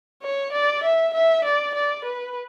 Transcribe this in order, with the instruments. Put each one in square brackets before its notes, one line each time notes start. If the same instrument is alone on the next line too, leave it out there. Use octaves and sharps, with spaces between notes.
[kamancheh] C#5
D5
E5
E5
D5
D5
B4